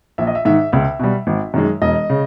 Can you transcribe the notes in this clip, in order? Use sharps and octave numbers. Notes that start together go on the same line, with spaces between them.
A#1 E5
D#5
E5
G#2 D#3 E5
C#2 E5
B2 G3
G#1
F#2 D#3 G#3
E1 D#5
C#3